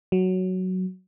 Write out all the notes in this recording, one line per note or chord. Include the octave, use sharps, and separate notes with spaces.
F#3